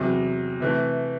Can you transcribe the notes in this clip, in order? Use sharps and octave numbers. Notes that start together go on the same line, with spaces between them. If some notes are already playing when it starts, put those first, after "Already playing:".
Already playing: E2 C3 F#3
C3 E3 A3